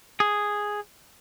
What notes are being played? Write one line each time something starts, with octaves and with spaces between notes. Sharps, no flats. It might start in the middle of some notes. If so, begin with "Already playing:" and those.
G#4